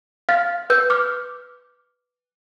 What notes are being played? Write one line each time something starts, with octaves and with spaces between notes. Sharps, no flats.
F5 F6 A6
B4 E6 G6
D6 F6